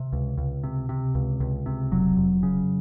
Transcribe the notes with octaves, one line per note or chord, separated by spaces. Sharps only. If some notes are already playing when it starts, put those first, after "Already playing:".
Already playing: C3
C#2
C#2
C3
C3
C#2
C#2
C3
F1 F#3
F1
C#3